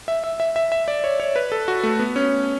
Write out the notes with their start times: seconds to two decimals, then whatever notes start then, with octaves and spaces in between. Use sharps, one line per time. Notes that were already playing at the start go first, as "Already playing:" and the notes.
0.08 E5
0.24 E5
0.40 E5
0.56 E5
0.72 E5
0.88 D5
1.04 C#5
1.20 C#5
1.36 B4
1.52 A4
1.68 F#4
1.83 A3
1.99 B3
2.16 C#4